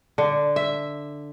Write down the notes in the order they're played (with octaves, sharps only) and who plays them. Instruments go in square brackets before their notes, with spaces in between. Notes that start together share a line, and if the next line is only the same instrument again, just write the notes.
[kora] D3
E5